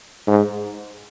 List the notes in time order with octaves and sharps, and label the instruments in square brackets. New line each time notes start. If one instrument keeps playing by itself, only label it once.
[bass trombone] G#2